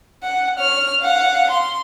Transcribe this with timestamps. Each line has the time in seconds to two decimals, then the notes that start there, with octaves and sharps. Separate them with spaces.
0.23 F#5
0.59 C#5 F6
1.01 F5 F#5
1.50 C6